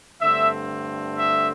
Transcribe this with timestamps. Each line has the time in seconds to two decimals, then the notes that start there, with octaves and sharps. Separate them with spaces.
0.21 G2 D3 A3 C4 E5
1.18 E5